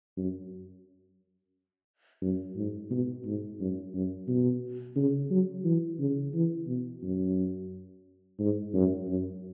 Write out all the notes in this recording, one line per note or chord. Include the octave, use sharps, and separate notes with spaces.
F#2
F#2
G#2
B2
G#2
F#2
F#2
B2
C#3
F#3
E3
C#3
E3
B2
F#2
G#2
F#2
F#2